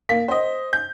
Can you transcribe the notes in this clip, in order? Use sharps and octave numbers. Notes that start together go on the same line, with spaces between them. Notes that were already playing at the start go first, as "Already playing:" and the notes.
A#3 B6
C5 D#5
G6